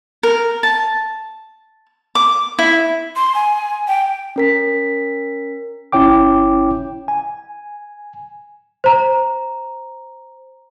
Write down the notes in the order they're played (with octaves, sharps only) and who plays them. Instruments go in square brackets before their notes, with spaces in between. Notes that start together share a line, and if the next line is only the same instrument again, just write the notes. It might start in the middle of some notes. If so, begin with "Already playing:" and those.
[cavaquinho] A#4
A5
D6
E4
[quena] C6
G#5
G5
[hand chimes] C#4 A#4 B6
[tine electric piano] G1 C#4 E4 C#5 G5 D6
G#5
[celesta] C5 A#5